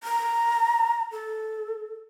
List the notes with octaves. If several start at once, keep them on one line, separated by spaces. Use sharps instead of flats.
A#5
A4